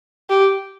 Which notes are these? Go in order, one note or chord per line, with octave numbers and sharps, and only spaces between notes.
G4